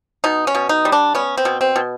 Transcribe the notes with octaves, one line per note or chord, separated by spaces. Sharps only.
B2 D#4
C#4
B2
D#4
G3
D4
B3 C#4
C4
B2
C4
B2